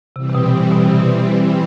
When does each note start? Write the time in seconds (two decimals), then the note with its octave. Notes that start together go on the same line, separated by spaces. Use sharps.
0.16 C3 E3 G3 C4
0.29 C3
0.35 B2
0.54 A2
0.72 B2
0.86 C3
1.00 B2